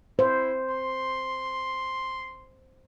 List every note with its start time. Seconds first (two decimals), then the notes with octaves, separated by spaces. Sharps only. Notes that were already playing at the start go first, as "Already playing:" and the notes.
0.19 E4 C5
0.70 C6